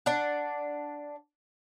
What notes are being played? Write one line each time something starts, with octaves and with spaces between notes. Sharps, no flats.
D4 D5 F#5